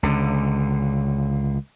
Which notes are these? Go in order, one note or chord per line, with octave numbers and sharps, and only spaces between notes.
C#2 D3